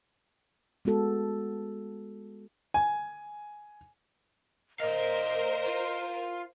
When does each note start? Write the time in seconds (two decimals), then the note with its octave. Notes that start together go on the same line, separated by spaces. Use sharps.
0.85 G#3 B3 F#4 A4
2.74 G#5
4.80 A#4 C5 D5 D#5 F5
5.66 F4